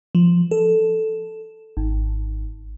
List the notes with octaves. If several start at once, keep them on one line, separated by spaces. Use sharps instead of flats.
F3
A4
G#1